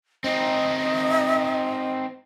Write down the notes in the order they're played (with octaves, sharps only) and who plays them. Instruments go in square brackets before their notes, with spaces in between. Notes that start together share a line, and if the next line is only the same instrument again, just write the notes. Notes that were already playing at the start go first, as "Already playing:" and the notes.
[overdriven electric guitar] C4 D#4 [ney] D#5